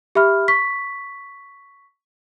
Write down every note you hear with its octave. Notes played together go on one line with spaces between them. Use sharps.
G4 E5 B5 F6
C#6 B6